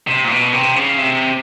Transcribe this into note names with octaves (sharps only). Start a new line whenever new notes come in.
C3
A#2
B2
C3
C#3
C3